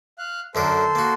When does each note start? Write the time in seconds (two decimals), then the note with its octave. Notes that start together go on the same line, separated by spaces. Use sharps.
0.18 F5 F#6
0.55 F#2 D3 A4 A#4 C5
0.95 A#3 F#4